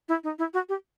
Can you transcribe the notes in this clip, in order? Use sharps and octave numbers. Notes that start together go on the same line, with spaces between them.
E4
D#4
E4
F#4
G4